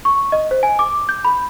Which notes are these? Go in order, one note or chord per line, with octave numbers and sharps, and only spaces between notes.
C#6
D#5
C5
G#5
D6
G6
B5